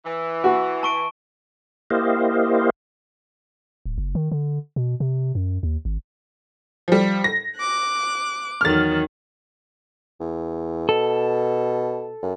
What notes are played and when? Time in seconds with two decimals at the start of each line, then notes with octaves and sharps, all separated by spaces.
0.05 E3
0.44 F#4
0.83 A5 C#6 D7
1.90 A#3 E4 G4 C5 D#5 F5
3.86 D1
3.98 F#1
4.15 D#3
4.31 D3
4.76 B2
5.00 C3
5.35 F#2
5.63 D#2
5.85 G#1
6.88 F3 G3
7.24 A#6
7.57 D6 F#6
8.61 E2 D#3 F#3 F6 A6
10.20 E2
10.89 B2 A4
12.22 F#2